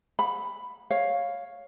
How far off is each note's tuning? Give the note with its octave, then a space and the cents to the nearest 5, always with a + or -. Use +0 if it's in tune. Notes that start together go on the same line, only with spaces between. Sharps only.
F#5 -35 B5 +5
C#5 +0 F5 +5